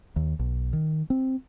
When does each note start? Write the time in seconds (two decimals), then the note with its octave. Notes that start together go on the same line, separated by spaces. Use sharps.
0.16 D#2
0.39 B1
0.73 D#3
1.10 C4